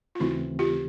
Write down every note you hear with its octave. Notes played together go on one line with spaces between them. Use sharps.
F4
D#2 C#3 E3 A3 C4 E4 F#4
F4 G4